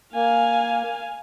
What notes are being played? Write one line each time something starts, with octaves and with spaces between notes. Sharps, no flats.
A#3 F5 G#5